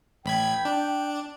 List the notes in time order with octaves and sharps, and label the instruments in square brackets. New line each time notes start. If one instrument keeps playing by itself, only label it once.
[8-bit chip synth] A1 B5 G#6 [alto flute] G5
[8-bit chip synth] D4